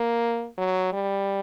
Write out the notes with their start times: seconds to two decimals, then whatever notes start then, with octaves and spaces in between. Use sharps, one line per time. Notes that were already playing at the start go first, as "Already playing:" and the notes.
Already playing: A#3
0.58 F#3
0.93 G3